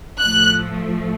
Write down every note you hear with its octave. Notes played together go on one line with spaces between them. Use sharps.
A2 F3 A3 F#6